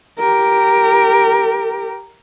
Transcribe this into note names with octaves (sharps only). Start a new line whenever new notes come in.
G4 A#4